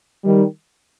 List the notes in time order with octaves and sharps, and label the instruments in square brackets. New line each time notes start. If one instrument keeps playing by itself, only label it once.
[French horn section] D#3 G3